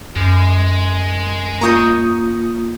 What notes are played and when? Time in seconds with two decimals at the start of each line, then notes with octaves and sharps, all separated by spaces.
0.16 F#2 G#3
1.61 A#3 F4 A#5 C#6 D#6 G6